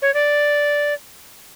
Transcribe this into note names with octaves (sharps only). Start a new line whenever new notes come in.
C#5
D5